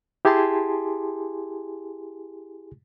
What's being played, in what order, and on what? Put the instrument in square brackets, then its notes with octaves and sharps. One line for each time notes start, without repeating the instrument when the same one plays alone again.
[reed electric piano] E4 G4 G#4 G#5 A5 C6